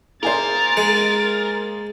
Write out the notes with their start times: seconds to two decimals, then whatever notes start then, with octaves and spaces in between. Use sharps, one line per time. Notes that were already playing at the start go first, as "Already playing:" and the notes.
0.23 A#3 G#4 A#4 C5 A6
0.77 G#3